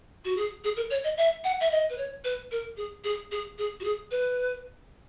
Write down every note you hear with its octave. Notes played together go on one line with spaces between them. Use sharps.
F#4
G#4
G#4
A#4
C#5
D#5
E5
F#5
E5
D#5
B4
C#5
B4
A#4
G#4
G#4
G#4
G#4
F#4
G#4
B4